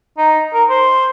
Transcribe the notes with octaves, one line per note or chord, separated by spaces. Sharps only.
D#4
A#4
C5